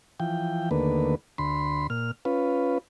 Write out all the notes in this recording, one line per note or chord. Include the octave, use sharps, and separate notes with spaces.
E3 F3 G5
D#2 D3 A3 A#3 B4
D2 B5 C6
A#2 F6
C#4 F4 B4